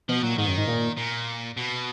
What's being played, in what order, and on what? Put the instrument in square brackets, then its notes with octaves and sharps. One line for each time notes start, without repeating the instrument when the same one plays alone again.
[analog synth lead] B2 [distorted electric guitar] F3
[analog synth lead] A#2 [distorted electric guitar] F#3
[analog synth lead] G#2 [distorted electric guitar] D#3
[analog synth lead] F#2
G#2
A#2
[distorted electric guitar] A#2
B2